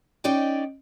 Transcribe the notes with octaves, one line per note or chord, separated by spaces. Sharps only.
C#4 D#4 C#5 D5 G5